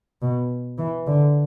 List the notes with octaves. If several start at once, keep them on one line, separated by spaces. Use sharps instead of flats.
B2
E3
D3